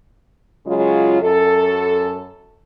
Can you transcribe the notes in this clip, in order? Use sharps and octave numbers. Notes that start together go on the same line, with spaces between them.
C#3 F#3 G#3 F4
F#2 A4